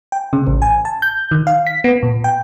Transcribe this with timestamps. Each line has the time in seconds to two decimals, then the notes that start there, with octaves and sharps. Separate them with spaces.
0.12 G5
0.33 C#3
0.47 A1
0.62 G#5
0.85 A5
1.02 G6
1.31 D#3
1.47 F5
1.67 B6
1.84 B3
2.03 A#2
2.24 G5